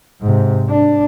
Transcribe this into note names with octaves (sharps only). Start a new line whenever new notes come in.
G#2 C3
D4